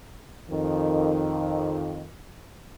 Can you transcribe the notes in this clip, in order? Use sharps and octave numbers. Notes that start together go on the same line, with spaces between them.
F2 D#3